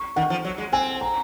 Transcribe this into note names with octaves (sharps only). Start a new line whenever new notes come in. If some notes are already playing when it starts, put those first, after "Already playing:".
Already playing: C#6
D#3 F#5
F3
F#3
G#3
C4 G#5
A#5